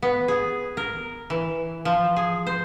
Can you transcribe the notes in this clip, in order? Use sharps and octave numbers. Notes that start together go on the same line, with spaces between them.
B3
G#4
A#4
E3
F3
G#4
C5